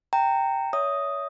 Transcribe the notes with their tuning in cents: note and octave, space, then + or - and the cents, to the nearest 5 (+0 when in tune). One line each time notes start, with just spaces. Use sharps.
G5 +0 A#5 -20
C#5 +25 E5 +0 D#6 +0